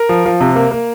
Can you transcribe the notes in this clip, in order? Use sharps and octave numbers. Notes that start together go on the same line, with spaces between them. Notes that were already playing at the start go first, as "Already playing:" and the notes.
Already playing: A#4
F3
F3
C3
A#3
A#3